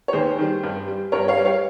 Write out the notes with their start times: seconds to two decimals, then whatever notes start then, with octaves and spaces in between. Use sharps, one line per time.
0.08 C#5
0.13 D#2 G#4 C5
0.39 D#3 G3
0.63 G2
0.87 G3
1.12 G2 A#4 C#5
1.28 C#5 F5
1.38 G3
1.45 C#5 F5